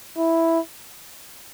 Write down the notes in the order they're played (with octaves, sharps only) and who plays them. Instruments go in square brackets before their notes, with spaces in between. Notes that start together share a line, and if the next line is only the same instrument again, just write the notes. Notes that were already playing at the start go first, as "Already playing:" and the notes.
[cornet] E4